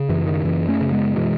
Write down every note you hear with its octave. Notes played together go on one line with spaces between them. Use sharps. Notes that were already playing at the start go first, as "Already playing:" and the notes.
Already playing: C#3
F#2 E3
D#3
F#2 E3
A3 C#4
C#3
G#3 B3
B2 E3 G#3